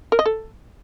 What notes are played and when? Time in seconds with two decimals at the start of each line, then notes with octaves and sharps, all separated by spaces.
0.12 A#4
0.19 D#5
0.26 A4